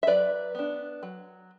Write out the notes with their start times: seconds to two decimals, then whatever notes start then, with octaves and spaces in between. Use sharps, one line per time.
0.03 E5
0.07 F#3 B4 D5
0.55 B3 D4
1.03 F#3